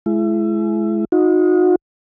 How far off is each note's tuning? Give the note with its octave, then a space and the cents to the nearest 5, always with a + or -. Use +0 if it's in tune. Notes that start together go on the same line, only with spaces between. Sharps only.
G#3 +30 E4 +30
D#4 +0 F#4 -35